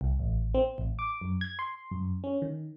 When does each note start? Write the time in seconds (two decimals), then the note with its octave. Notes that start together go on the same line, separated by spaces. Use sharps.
0.01 C2
0.19 A1
0.54 C4
0.78 A1
0.99 D6
1.21 F#2
1.41 G#6
1.59 C6
1.91 F#2
2.24 C#4
2.42 D#3